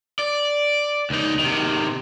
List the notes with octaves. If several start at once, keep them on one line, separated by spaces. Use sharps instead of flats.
D5
C#2 D#4
C3 D#3